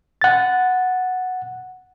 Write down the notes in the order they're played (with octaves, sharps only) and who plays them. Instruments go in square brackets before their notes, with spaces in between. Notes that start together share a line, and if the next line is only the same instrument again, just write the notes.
[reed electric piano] F#5 A6